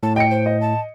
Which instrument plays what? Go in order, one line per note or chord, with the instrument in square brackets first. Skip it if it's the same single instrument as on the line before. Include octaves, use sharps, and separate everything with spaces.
[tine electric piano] A2 [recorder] A5
[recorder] D#5 [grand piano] G5 C#7
[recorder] C5
[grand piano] D#5
[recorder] A5